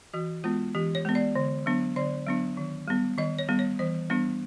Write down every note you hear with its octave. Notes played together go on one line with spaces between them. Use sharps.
E3 F#4
G#3 B3 F4
E3 G4
C#5
G#3 B3
D5
D3
F#3 B3 D4
D3 D5
F#3 B3 D4
D#3
G3 B3
D#3 D#5
C#5
G3 B3
C#5
E3 C5
G3 B3 D4